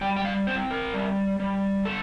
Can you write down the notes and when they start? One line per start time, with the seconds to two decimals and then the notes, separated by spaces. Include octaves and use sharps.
0.01 G3 G5
0.16 G5
0.25 F5
0.47 C4 C5
0.71 A#4
0.94 G3
1.40 G3
1.85 D3 A4